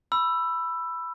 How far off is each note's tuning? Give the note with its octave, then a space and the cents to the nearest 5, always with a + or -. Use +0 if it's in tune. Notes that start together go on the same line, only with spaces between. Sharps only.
B5 +0 E6 +15